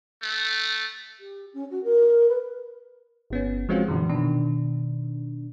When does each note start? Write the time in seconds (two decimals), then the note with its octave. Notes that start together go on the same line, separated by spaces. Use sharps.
0.22 A3
1.20 G4
1.53 C#4
1.70 F#4
1.84 A#4
2.29 B4
3.30 G1 B3 C#4
3.69 F3 G#3 C4 C#4 F4 F#4
3.88 F#2 A#2 D3 E3
4.09 B2 D#3 D4